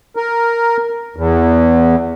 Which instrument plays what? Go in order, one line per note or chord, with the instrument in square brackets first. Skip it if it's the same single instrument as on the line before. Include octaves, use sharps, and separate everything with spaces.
[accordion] A#4
E2